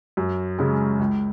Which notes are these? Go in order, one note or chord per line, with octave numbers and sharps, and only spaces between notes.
F#2
C#3 G#3
C#2